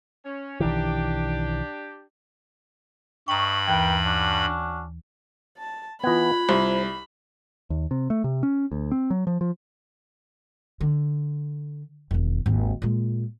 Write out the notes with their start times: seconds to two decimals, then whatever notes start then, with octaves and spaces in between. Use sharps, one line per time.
0.25 C#4
0.60 B1 D#3 E3 D4 G4
3.28 G2 D#5 G5 A#5 B5 C#6
3.68 D#2 E3 A#4 B4 G5
4.04 C#4 D4 F#4
5.58 A5
6.04 E3 B3 F4 B5 F#6 G#6
6.49 C2 C5
7.70 D#2
7.91 C3
8.10 A3
8.24 C3
8.43 C#4
8.72 D2
8.92 C4
9.10 F#3
9.27 F3
9.41 F3
10.81 D3
12.11 E1 D#2
12.46 G#1 D#2
12.82 A#2 G#3